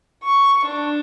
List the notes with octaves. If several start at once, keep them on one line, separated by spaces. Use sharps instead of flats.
C#6
D4